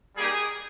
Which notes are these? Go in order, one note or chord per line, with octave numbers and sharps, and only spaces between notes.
G3 A#3 D#4 G4 G#4